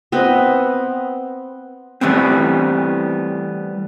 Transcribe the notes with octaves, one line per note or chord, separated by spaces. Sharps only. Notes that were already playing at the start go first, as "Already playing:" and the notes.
B3 C4 B4 D#5
E3 G3 A3 B3 C4